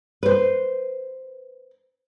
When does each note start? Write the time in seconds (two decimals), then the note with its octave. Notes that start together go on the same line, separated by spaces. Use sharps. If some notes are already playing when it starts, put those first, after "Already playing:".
0.23 B4 C5